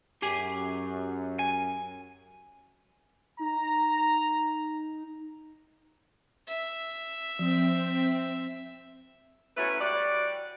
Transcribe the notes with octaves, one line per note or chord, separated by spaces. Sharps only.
F#2 G4 G#4 G#5
G#5
D#4 A#5
E5
F3 C4
F#3 A3 C#4 E4 B4
G3 F#4 D5